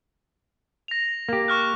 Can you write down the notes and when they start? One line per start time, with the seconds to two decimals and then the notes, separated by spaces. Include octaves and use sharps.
0.88 A#6 F7
1.29 A#3 G4
1.48 C#6 F6 F#6